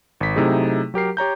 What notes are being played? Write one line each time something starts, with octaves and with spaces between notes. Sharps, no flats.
G#1 B6
C3 F#3 A3 D#4 E4 G#4
F#3 G4 A#4 C7
G4 C#5 A#5 G6